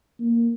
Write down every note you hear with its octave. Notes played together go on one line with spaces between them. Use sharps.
A#3